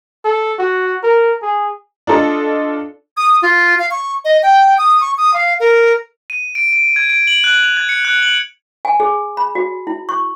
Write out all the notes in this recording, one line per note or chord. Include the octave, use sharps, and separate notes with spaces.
A4
F#4
A#4
G#4
D4 F4 A4 D#5
D#6
F4
F5
C#6
D#5
G5
D#6
C#6
D#6
F5
A#4
D#7
D7
D7
G#6
D7
F#7
F#6
F7
G#6
C#7
F#6
F#7
G#5
G#4
B5
F#4
E4
C#6